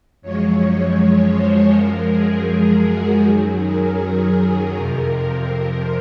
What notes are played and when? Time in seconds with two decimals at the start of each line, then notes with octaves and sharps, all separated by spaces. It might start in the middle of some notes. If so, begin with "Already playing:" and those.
0.22 F#2 F3 G#3 C#5
1.35 C5
1.72 F#2 F3 G#3 A#4
2.11 G#4
2.49 G#4
2.87 F#4
3.24 F#2 D#3 F#3 G#4
3.62 A#4
4.00 G#4
4.75 F2 C3 F3 A#4